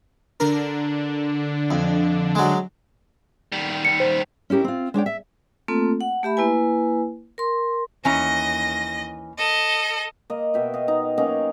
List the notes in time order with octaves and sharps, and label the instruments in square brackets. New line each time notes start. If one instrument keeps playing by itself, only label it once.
[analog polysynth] D3 D4 [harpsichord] A#4
[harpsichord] F2
F#3 G#3
[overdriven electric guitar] D#3 G3
[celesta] C#7
C5
[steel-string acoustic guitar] C#4 E4 G4 A#4
C4 F4
G#3 D4 C#5 G5
E5
[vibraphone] A3 A#3 C4 F4 A4
F#5
A3 G4 E5 B5
A#3 E4 B4 G#5
A#4 C6
[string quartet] D#2 D#5 A#6 [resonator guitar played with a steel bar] E3 C#4 A#5
[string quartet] A4 D#5
[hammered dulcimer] A#3 D#5
B2 E5 G5
D#5 F5
D#4
F#3 A#3 C#4 D#4